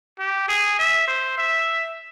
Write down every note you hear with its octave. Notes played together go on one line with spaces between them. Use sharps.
G4
G#4
E5
C5
E5